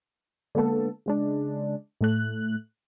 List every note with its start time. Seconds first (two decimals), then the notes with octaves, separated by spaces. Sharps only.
0.55 D3 G#3 A#3 B3 A4
1.06 C#3 G#3 D4
2.01 A2 A3 F#6